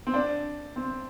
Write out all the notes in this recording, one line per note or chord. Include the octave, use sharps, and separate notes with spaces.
C4
D4
C4